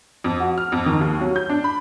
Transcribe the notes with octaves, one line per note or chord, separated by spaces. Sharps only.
F2
F#4
F6
F2
D#3
D#2
F#3
G6
D4
B5